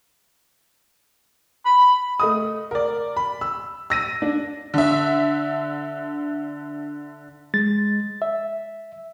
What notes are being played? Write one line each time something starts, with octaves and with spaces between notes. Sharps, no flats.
B5
A3 D#5 D#6
A#4 D5
B5
E6
E6 A#6 D#7
D4
D3 E5
G#3 A6
E5